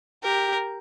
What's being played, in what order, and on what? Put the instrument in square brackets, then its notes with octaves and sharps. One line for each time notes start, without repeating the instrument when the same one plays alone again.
[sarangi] G4 [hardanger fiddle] A#4